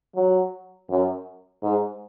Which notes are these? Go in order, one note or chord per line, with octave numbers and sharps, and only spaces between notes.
F#3
F#2
G#2